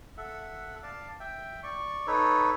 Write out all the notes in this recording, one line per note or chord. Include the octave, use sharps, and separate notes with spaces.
A4 E5 F#5
D5 F5 A5
E5 G5
D5 C#6
D#4 A4 B4 C#5